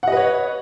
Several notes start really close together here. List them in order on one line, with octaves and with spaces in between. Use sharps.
F#5 D#5 B4 C#5